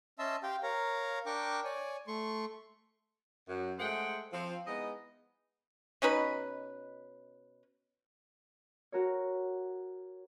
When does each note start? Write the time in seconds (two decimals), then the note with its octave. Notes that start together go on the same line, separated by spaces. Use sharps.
0.19 C#4 D#5 E5 A5 C6 E6
0.43 G4 F5 G5 C6
0.63 A#4 C#5 F5 A#5
1.26 D4 A#4 G5 C#6 D6
1.64 C#5 D5 G#5
2.07 A3 C6 C#6
3.49 F#2
3.79 G#3 A3 G#4 C5 F#5 G5
4.32 F3 C4
4.66 G#3 B3 D#4 E4 D#5
6.02 B2 C#4 D#4 B4
8.92 F#4 A#4 C#5